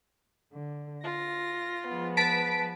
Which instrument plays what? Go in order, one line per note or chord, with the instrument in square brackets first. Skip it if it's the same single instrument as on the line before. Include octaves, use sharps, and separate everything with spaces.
[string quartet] D3
[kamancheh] F4 [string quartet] A#6
[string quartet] F3 G#3 B3
[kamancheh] B4 [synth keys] A5 B6 D7